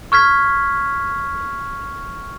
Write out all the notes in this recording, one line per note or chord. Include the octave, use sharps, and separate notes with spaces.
C#6 F6 G#6 B6